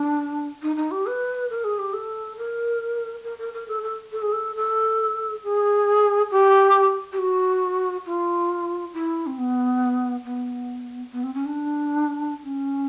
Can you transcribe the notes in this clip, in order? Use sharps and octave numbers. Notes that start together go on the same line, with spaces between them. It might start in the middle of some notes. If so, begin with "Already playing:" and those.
Already playing: D4
D#4
D#4
G4
B4
A#4
G#4
G4
A4
A#4
A#4
A#4
A#4
A4
A4
A4
G#4
A4
A4
G#4
G4
G4
F#4
F4
E4
C4
B3
B3
B3
C4
C#4
D4
C#4